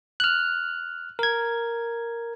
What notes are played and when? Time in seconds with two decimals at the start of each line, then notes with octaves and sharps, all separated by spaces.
0.20 F6 F#6
1.19 A#4 G#6